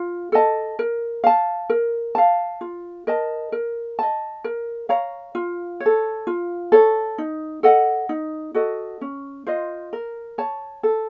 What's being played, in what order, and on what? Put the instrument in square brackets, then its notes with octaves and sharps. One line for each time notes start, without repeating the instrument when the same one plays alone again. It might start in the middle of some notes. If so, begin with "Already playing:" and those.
Already playing: [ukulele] F4
A4 D#5 A5
A#4
F5 A5
A#4
F5 A5
F4
A#4 D#5 A5
A#4
D#5 A5
A#4
C#5 F5 A#5
F4
C#5
A4
F4
A4 C#5
D#4
A4 D#5 F#5
D#4
F#4 A4 D#5
C#4
F4 C5 D#5
A#4
C#5 A5
A4